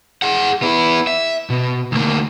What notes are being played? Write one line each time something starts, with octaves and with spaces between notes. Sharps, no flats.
G#4 F#5
B3 E4
E5
B2
D2 A#3